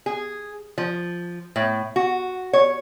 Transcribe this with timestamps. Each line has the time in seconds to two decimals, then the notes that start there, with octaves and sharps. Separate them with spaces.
0.06 G#4
0.78 F3
1.56 A2
1.96 F#4
2.53 C#5